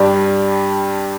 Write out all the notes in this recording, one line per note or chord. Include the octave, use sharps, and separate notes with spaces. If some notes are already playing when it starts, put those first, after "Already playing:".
Already playing: G2 G3 D4 G4